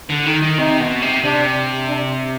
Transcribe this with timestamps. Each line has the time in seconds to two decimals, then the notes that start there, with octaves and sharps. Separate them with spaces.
0.10 D3
0.26 D#3
0.42 D#3
0.58 C3 D#4
0.80 B2
1.02 C3
1.24 C3 D4
1.89 D4